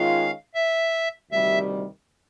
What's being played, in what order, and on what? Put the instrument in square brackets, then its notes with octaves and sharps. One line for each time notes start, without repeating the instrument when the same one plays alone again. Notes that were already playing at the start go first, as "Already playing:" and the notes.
Already playing: [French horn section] D#3 G#3 C#4 F4 [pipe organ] F5
[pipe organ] E5
[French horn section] D2 C3 D#3 G3 [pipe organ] E5